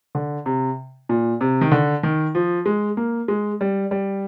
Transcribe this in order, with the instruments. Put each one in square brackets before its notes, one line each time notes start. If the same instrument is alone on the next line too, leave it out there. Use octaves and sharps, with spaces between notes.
[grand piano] D3
C3
A#2
C3
D#3
D3
D#3
F3
G#3
A#3
G#3
G3
G3